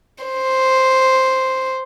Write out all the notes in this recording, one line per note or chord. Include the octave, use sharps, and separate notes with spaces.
C5